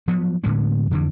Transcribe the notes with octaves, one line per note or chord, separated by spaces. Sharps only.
F3 F#3 B3
A2 D3 G#3 B3
F2 D3 E3